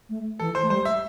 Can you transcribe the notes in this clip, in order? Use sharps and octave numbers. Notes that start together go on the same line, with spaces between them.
A3
E3 A4
C5
A3
G3 C5
E5